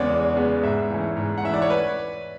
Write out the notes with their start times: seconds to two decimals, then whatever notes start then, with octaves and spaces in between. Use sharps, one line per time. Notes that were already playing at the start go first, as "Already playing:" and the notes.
Already playing: E2 C#3 G#3 B3 C#5 D5
0.10 E2
0.36 C#3 G#3 B3
0.63 G#2 E5
0.90 E3 A3 C#4
1.17 G#2
1.38 F#5
1.44 E3 A3 C#4 E5
1.54 D5
1.62 C#5
1.70 B4